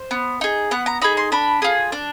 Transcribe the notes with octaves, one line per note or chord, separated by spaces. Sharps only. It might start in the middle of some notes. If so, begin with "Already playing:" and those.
Already playing: C5
B3
D#4 G#4
B3 F#5
A#5
D#4 G#4 B5
C6
D4 B5
F4 G#4
D4